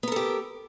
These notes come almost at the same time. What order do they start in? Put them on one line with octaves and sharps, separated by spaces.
B3 A#4 A4 G4